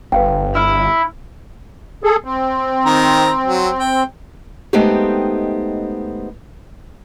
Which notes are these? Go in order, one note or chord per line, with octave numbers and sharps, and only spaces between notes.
G1 B4 F5 G5
E4 E6 F6
G#4 A4
C4
D#3 A#5
F#3
G5
G#3 A3 B3 C4 D#4 G4